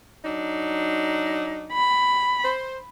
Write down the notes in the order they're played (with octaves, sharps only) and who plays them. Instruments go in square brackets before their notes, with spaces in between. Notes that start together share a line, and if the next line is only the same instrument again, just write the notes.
[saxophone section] F#3 D4 D#4
[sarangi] B5
[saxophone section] C5